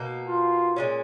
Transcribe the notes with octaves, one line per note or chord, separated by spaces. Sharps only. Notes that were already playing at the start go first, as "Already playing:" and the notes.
Already playing: B2 A#3 D#4
F4
A#2 G#3 C#4